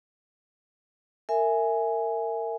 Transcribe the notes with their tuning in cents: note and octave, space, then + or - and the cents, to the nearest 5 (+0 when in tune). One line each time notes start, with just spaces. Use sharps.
A#4 -30 E5 +0 G#5 +0